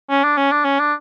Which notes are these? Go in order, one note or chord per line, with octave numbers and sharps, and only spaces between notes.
C#4
D4
C#4
D4
C#4
D4